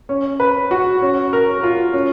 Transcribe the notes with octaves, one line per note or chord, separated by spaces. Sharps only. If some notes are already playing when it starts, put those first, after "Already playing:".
C#4
B4
F#4
C#4
A#4
F4
C#4